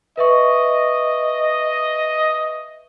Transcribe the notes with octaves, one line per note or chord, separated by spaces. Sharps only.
B4 D#5 E5 C#6